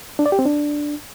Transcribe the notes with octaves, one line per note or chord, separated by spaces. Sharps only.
D4
D5
G4
C4
D4